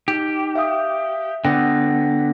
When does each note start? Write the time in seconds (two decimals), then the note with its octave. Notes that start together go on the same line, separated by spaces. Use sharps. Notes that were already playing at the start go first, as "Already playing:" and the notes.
0.08 D#4 G4
0.55 E5 F5 D#6
1.45 D3 B3 F#5 G5 A#6